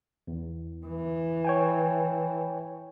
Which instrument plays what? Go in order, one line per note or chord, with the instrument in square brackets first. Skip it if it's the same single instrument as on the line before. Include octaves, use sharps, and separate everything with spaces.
[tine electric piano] E2
[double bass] E3
[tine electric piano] C#5 G5 G#5